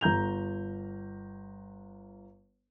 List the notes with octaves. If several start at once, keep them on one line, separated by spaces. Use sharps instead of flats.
G1 A#5 G6 F7